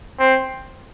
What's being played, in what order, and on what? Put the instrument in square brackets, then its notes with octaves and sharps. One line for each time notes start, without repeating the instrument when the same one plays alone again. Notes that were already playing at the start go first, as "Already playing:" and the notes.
[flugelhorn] C4